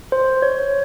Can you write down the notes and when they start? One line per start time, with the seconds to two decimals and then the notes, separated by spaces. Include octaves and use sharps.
0.12 C5
0.42 C#5